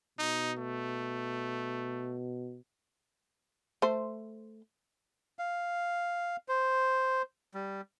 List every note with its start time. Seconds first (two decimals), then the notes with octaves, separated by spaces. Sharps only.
0.19 B2 D#4
0.58 A3
3.82 A3 C5
5.39 F5
6.48 C5
7.54 G3